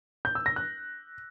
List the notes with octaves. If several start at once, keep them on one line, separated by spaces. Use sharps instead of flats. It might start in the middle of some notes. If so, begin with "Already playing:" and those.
G6
E6
A#6
F#6